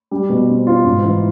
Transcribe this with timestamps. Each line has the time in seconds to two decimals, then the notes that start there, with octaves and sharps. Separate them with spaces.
0.11 G3
0.30 B2
0.48 C4
0.67 F4
0.84 G#2
1.04 E3